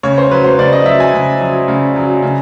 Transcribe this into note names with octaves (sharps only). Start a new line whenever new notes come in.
C#3 C#5
C5
F#3 B4
C5
C#3 D5
D#5
F#3 E5
G#5
C#3
F#3
C#3
F#3
C#3